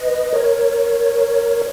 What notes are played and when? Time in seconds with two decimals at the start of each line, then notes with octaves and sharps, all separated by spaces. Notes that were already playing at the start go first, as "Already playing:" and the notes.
Already playing: B4 D#5
0.33 A#4 C#5